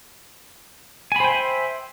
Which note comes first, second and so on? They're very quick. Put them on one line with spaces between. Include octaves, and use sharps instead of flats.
G#5 B5 C5 G5 E5